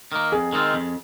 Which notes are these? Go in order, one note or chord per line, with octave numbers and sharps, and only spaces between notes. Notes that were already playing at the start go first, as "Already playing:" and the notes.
D#3 A#3
F2 G#4
D#3 G#3 C4 F4
F2